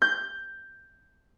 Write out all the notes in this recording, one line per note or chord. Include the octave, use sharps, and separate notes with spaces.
G6